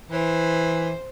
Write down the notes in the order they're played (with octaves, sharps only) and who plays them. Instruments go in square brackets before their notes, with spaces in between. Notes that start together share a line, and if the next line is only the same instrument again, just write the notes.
[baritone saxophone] E3 [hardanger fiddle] C5